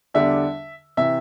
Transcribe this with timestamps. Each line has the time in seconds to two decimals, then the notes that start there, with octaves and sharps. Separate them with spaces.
0.14 E2 D3 G3 D4 E5
0.97 C3 E3 E5